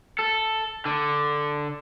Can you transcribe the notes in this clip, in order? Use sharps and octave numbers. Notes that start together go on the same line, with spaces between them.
A4
D3